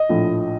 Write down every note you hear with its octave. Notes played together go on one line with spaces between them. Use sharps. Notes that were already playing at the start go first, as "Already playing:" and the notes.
Already playing: D#5
A#1 A2 F3